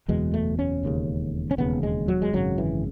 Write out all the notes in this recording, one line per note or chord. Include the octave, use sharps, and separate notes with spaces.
F#1 E2 B2 G#3
A3
C#4
E1 D#2 C#3
C#4
E1 D#2 C#3 B3
G#3
F#3
G#3
G#1 F#2 C#3 F#3
E3